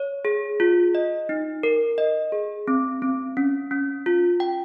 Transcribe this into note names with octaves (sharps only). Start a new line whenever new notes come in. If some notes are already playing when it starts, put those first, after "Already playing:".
Already playing: C#5
G#4
F4
D#5
D#4
A#4
D#5
G#4
C4
C4
C#4
C#4
F4
G5